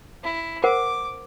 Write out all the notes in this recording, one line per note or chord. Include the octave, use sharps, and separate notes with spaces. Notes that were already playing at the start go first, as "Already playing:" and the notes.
E4
A#4 C5 F#5 D6